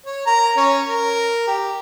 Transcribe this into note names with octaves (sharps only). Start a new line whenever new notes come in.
C#5
A#4 A#5
C#4 C#5
A#4
G4